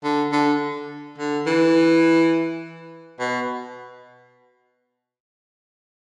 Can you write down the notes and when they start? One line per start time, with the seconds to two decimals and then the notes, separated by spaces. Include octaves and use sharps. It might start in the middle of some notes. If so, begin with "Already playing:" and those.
0.04 D3
0.32 D3
1.18 D3
1.47 E3
3.20 B2